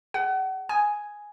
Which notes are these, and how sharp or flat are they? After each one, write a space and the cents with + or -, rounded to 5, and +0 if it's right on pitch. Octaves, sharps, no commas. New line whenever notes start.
G#4 +0 F#5 +35
G#5 +0 D#6 +0